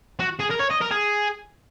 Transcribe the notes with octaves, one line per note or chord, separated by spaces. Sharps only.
F#4
G#4
A#4
C#5
D#5
A#4
G#4